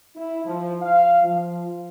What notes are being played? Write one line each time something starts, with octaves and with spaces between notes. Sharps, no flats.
E4
F3
F5
F3